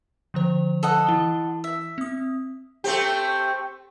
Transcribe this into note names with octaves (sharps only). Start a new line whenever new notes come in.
D3 F3 C5
A4 D#5 F#5
E3 E4 G7
E5
C4 D#6
A3 C4 G4